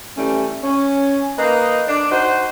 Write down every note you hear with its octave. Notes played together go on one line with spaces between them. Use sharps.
E3 G3 A3 C#4
C#4
A#3 D#4 B4 D#5
D4
D#4 F#4 C5